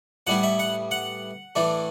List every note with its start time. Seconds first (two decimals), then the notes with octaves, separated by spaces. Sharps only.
0.27 A2 G3 B3 E4 F#5
0.43 E5
0.59 F#5
0.91 F#5
1.55 A2 E3 A3 D4